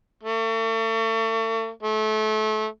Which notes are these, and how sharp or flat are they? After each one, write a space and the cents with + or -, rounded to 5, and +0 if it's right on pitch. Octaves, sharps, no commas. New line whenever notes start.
A3 +40
A3 -25